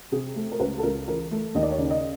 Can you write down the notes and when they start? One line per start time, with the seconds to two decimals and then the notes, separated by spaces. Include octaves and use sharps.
0.12 C3 G#4
0.36 A3
0.51 A#4
0.60 C#2 B4
0.78 A4
0.83 C#2 A#4
1.07 E3 A#4
1.31 A3
1.55 D#2 D#5
1.63 D5
1.71 C#5
1.78 C#3 D5
1.91 D#5